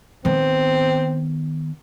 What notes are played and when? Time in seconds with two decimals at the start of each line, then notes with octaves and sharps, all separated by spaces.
0.25 D#3 B3 C4